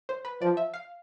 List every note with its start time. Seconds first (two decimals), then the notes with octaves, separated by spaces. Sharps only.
0.09 C5
0.25 B4
0.41 F3 D5
0.57 E5
0.74 F5